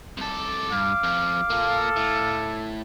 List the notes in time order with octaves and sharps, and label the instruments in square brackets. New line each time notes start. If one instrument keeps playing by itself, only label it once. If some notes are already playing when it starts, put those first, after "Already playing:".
[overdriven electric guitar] C2 A4 [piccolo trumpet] D6
[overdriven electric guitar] G2 [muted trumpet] F5
[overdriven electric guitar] F2 F3
[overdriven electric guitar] A#3 F4 [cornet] A4
[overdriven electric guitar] A2